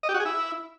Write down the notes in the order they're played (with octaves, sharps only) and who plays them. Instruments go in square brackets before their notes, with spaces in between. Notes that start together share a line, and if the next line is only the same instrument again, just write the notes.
[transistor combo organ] D#5
G4
F#4
G#4
E4